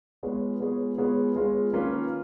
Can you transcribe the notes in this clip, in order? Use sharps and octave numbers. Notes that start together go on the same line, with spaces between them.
G#3 B3 F4 G#4 C#5
G#3 B3 F4 G#4 C#5
G#3 B3 F4 G#4 C#5
G#3 B3 F4 G#4 C#5
D#3 A#3 C#4 F4 B4